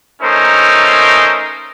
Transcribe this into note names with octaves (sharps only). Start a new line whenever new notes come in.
A3 C#4 D#4 A#4 C5